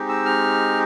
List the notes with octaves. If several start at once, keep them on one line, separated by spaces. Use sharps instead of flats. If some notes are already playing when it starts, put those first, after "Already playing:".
Already playing: G#3 C4 D#4 G4
E6
F6